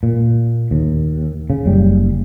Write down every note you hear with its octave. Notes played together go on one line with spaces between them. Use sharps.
A#2
D#2
C#3
F#1 G3